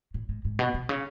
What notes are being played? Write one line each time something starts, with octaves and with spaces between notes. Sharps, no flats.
A2
G#2
G#2
B2
B2
C#3